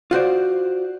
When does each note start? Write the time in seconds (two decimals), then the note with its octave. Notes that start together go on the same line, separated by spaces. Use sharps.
0.11 F4 F#4 C5 D5